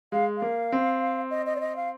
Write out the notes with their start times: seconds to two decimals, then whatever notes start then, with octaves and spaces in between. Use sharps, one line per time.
0.12 G#3 F5
0.37 A#3 F5
0.72 C4
1.31 D#5
1.46 D#5
1.56 D5
1.60 D#5
1.76 F5